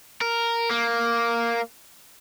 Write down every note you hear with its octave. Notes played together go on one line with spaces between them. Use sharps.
A#4
A#3